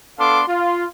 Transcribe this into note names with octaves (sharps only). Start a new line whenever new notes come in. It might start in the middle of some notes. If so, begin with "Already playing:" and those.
B3 D4 A4 F5 C6 D6
F4